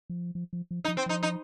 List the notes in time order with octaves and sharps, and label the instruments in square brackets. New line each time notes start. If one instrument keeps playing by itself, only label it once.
[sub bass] F3
F3
F3
F3
[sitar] D#4
[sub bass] F3
[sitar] C4
[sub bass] F3 [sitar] D#4
[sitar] D#4